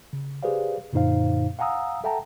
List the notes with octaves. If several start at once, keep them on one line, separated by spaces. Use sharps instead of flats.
C#3
G4 G#4 B4 C5 D5 F5
F#2 A#2 D3 D#4 C5 F5
F5 F#5 G#5 A#5 D#6 E6
A4 E5 F#5 G5 A5 A#5